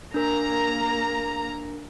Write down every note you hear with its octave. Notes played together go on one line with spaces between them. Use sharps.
A#3 D4 A#4 A#5